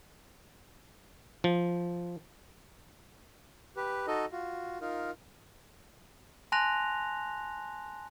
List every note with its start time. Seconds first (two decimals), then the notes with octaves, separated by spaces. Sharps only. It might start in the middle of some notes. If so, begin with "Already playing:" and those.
1.44 F3
3.76 G4 B4
4.07 D#4 F#4 A4 D#5
4.32 F4 F#4
4.81 D#4 F4 A#4
6.52 G#5 A5 C6 F#6 A#6 F7